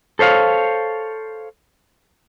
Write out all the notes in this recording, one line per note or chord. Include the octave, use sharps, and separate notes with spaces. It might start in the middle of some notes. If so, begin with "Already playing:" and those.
A4 C5 C#5 F5